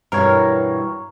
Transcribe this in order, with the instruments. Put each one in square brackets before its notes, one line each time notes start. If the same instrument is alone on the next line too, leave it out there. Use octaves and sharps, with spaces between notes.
[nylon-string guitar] G2 B2 E3 [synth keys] A#4 C#5